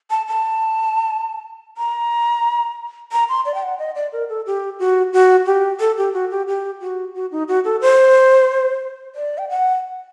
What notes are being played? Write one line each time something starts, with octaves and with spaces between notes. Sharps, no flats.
A5
A5
A#5
A#5
C6
D5
G5
F#5
D#5
D5
A#4
A4
G4
F#4
F#4
G4
A4
G4
F#4
G4
G4
F#4
F#4
D#4
F#4
A4
C5
D5
G5
F#5